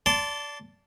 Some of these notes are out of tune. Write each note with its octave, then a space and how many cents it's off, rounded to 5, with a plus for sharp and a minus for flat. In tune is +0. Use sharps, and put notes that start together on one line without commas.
D5 -25 A5 +0 C6 -15